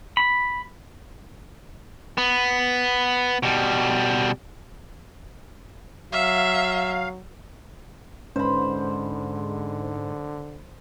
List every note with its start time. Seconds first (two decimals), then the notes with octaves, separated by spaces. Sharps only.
0.17 B5
2.18 B3
3.43 B2 G3
6.13 F#3 E5 F5
8.36 G#2 D3 C#4 C5 B5